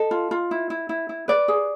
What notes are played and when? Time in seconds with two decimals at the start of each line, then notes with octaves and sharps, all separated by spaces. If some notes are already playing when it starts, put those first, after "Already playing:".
Already playing: A4 D#5
0.11 F4
0.31 F4
0.51 E4
0.70 E4
0.89 E4
1.09 E4
1.28 B4 D5
1.48 G#4